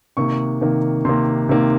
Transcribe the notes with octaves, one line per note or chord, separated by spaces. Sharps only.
C3 D#3 A#3 C#6
C3 D#3 A#3
C3 D#3 A#3 C6
C3 D#3 A#3